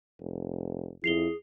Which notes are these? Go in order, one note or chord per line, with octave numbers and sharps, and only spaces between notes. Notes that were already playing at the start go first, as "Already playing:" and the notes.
F1
F2 E4 G#4 C7 F7 G7